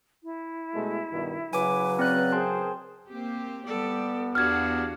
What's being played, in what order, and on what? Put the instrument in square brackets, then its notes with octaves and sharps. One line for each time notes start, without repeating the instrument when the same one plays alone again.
[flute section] E4
[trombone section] B2 G#3 A3
G2 B2 D#3
[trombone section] C#3 F#3 [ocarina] B4 [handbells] G#5 D6
[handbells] C4 D5 F#6
[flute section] G#4 A#4 C5 [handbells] G5 A5 C6
[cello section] A#3 C4 G4
[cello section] G3 G4 D5 [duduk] B3 [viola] A4
[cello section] E2 F#4 F5 [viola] D4 G4 [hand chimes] F6 G#6